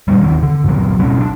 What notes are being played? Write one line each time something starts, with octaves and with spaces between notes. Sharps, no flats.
G2 A#2 D#3 G3
D#2 D#3 C4
D3
G2 A#2 F#3
B2 F#3 C4 C#4
D4